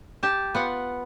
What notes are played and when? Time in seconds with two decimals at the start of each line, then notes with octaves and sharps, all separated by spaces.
0.23 G4 A5
0.55 B3 F4 F#5